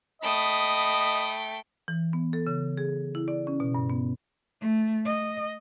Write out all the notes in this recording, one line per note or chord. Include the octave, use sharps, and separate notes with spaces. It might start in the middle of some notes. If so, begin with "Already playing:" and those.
A3 D#5 G5 B5 D#6
E3
B3
A4
C#3
G#4
E4
D5
C#4
B2
G2
B3
A3
D#5